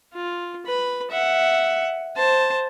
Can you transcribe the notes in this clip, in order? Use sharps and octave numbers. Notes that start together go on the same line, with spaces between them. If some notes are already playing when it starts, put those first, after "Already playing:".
F4
B4 B5
E5 F#5
C5 A5